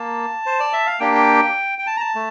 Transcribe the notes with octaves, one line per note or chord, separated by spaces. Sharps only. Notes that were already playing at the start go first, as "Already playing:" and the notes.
Already playing: A#3 A5
C5
D5
E5
F5
A#3 D4 G4 G5
G5
G5
A5
A#5
A5
A3